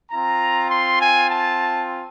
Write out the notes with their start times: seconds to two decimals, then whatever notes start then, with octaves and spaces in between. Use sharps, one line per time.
0.10 C4 F4 A#5
0.70 C6
1.01 G#5
1.30 A5